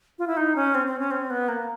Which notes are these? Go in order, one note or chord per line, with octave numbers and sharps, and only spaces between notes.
F4
E4
D#4
C#4
C4
C4
C#4
C4
B3
A#3